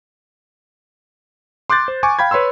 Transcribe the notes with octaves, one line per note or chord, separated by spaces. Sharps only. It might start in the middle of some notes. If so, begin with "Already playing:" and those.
C6 D6 F#6 G6 A6
C5
G#5 C#6 D6
F5 G5 B5 G#6
B4 C#5 B5 C6 E6